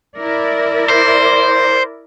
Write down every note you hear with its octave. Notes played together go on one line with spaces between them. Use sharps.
E4 A#4 D5
C5